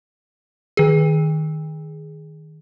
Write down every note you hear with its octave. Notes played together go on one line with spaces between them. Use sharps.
D#3 G#4